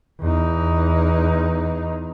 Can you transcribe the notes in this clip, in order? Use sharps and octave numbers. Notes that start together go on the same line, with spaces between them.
E2 D#4